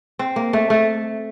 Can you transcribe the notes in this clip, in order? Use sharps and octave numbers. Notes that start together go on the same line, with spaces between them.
C4
A#3
A3
A3